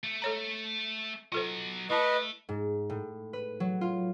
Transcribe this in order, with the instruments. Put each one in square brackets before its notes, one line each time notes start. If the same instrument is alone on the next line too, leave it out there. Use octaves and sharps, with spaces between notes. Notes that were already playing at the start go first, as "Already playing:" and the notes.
[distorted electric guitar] A3
[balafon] A4 C#5 A#5
[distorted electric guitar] F#3 D#5 [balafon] F4 A4 C5
[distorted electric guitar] A3 [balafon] E4 A5 [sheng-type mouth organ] B4 D#5
[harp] G#2
A2
B4
F#3
F4